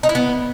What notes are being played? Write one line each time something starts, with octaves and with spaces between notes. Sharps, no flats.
D#4
E4
B3